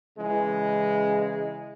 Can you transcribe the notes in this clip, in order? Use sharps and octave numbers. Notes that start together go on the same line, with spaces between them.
C#3 E3 G#3